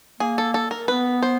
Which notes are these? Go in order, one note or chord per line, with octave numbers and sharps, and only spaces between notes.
A#3 G#4
A4
A4
A#4
B3 B4
C5